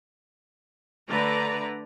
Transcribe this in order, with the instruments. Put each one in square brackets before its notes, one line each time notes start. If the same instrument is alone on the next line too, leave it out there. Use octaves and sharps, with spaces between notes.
[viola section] D3 A3 B4 D5 A#5